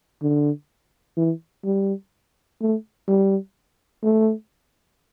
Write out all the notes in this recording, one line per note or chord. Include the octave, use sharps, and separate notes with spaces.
D3
E3
G3
A3
G3
A3